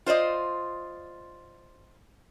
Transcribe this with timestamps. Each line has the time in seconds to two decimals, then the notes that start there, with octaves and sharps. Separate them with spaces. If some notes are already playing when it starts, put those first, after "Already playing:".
0.06 F4 C5 D5 D#5